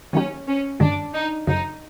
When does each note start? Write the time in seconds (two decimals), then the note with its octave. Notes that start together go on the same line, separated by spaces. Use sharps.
0.13 D#3 F#3 A#3 C#4 D#4 G4
0.47 C#4
0.80 G2 D#3 G#3 D4
1.13 D#4
1.47 F#2 C#3 F#3 D#4